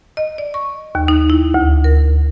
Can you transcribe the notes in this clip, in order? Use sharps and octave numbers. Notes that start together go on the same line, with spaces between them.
D#5
D5
C#6
D#2
D#4
E4
D2
A#4